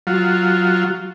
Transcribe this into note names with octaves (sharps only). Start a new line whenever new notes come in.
F#3 F4